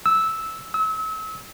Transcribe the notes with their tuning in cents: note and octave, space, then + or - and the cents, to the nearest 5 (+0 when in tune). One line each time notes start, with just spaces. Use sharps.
E6 -10
E6 -35